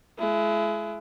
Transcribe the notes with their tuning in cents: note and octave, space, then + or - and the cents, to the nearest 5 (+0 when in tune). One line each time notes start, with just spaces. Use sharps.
G#3 +35 E4 +35